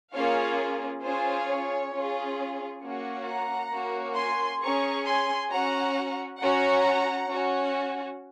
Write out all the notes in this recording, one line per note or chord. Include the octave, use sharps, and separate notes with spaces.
A#3 C#4 F4 G#4 C#5 F5
C#4 F4 G#4 C5
C#5
C#4 F4 G#4
A#3 C#4 F#4
F#5 A#5
A#3 C#4 F#4
G#5 C6
C#4 G#4 A#5 C#6
G#5 C6
C#4 F#4 F#5 A#5
C#4 F#4 F#5 A#5
C#4 F#4